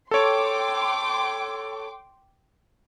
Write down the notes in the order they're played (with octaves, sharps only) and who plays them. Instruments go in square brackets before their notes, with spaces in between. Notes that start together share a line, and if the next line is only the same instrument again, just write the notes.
[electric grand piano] A4 C#5 [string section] G5 C6 D6